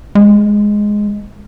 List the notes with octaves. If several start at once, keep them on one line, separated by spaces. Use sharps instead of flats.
G#3